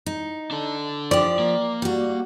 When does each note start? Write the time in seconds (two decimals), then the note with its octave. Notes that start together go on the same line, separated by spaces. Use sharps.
0.06 D#4
0.51 D4 A4
1.11 F3 G4 D5
1.39 A#3
1.82 G3 F#4